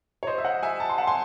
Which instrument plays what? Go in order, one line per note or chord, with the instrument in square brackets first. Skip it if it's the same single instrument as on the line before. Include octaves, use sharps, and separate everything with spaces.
[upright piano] C#5
C5 D#5
E5
D#5 F#5
E5 G#5
A5
C6
F#5 A5
G#5 C6